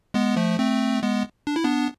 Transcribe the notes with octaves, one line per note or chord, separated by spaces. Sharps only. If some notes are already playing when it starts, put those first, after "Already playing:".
G#3 B3
F3 A3
A3 C4
G#3 B3
D4
E4
B3 D4